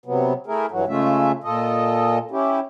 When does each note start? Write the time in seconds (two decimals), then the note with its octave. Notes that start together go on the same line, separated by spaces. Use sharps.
0.06 C3 F#3 B3
0.47 A3 E4 G#4 A#4
0.71 G2 E3 F#3 F#4
0.88 C#3 G#3 A3 C#4 F4 E5
1.44 A#2 F4 A4 D#5
2.31 C#4 E4 G4